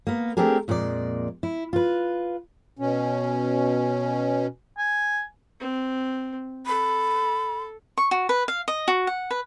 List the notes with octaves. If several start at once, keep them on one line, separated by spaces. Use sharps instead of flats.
A#3 B3
A3 C4 D4 G4 G#4 A#4
F2 A#2 G#3 G4 D5
E4
F4 B4
B2 C#4
G#5
C4
A4 B5
C#6
F#4
B4
F5
D#5
F#4
F#5
B4